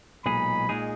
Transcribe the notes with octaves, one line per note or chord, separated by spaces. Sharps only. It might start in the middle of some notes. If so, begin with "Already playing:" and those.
B1 A#2 G#3 D#4 G#4 B5
A#2 G#3 D#4 G#4